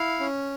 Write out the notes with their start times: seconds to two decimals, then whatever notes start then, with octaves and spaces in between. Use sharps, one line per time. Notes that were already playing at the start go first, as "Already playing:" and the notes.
Already playing: E4 F5
0.20 C#4